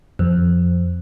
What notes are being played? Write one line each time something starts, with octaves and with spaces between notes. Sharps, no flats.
F2